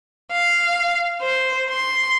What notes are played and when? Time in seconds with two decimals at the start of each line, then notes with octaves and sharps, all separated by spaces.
0.32 F5
1.21 C5
1.70 C6